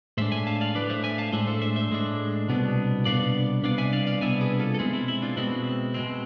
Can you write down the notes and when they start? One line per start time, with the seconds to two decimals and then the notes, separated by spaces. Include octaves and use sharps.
0.17 A2 G#3 D4 C5 E5
0.32 E5 G#5
0.47 F5 A5
0.61 D5 F5
0.75 A2 G#3 D4 B4 D5
0.89 C5 E5
1.04 E5 G#5
1.18 F5 A5
1.32 A2 G#3 D4 C5 E5
1.47 A4 C5
1.62 C5 E5
1.76 C5 E5
1.91 A2 G#3 D4
2.48 C2 B2 B3 D4
3.05 C2 B2 B3 D4 D5 F5
3.63 C2 B2 B3 D4 D5 F5
3.78 E5 G#5
3.93 D5 F5
4.07 D5 F5
4.21 C2 B2 B3 D4 E5 G#5
4.41 G#4 B4
4.59 F4 A4
4.74 A4
4.79 B2 G#3 C4 E4 G#4
4.94 E4
5.08 E4
5.22 D4 F4
5.37 B2 G#3 C4 E4
5.94 B2 G#3 C4